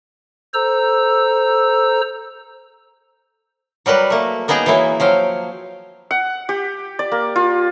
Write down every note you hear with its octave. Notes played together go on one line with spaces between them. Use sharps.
A4 C5 A#5 E6
F#3 G3 A#4 B4
A3 A#3
A#3 B3 D#4 G#4 G5 A#5
E3 F#3 A#3 E4
F3 F#3 F5 G5
F#5
G4
D5
A#3
F4